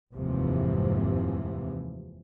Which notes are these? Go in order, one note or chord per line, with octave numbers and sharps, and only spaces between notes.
F1 D#2 G#2 C3 E3 F3